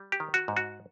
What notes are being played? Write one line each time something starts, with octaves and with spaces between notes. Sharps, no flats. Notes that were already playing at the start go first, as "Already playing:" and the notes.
Already playing: G3
G4
D#3
F#4
G#2
F#4